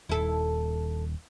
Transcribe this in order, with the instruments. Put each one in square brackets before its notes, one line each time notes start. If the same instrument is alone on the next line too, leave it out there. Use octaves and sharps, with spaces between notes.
[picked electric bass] D#1 D#3 [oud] E4 A4